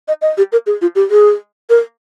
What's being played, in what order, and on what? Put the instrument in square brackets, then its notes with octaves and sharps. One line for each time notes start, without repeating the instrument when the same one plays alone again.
[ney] D#5
D#5
G4
A#4
G#4
F4
G4
G#4
A#4